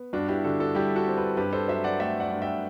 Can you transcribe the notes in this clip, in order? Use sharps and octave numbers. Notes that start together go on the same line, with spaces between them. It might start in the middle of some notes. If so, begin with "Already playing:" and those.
Already playing: B3
G2 D4 F#4
E4 G4
D3 F#4 A4
F#4 A4
G3 E4 G4
F#4 A4
C4
G4 B4
G2 G4 B4
A4 C5
F#3 C5 E5
D5 F#5
A3 E5 G5
D5 F#5
G2
E5 G5